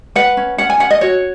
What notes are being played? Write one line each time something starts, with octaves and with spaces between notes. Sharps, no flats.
B4 F#5
C#4
C#4 F#5
G#5
C#4 F#5
D#5
F#4 C#5